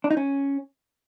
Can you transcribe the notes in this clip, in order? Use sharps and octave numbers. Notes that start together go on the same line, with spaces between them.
D4
D#4
C#4